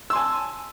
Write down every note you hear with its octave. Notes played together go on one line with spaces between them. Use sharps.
G#5 A5 C6 E6